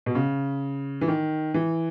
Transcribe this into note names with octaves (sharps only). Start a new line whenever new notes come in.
B2
C#3
E3
D#3
E3